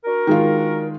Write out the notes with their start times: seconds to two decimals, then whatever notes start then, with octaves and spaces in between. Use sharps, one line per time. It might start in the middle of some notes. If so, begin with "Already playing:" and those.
0.05 D4 F#4 A#4
0.27 D#3 G#3 F4